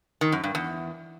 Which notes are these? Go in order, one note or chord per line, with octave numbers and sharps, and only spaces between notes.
D#3
F#2
G2
E2